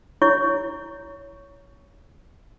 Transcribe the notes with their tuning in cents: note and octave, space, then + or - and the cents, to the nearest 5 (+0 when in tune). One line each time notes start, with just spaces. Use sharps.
E4 +0 C#5 +15 C#6 +15